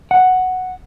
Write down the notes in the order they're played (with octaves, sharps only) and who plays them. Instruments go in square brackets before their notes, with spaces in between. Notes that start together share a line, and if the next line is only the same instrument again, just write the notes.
[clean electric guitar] F#5